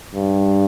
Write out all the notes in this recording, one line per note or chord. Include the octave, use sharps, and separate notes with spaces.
G2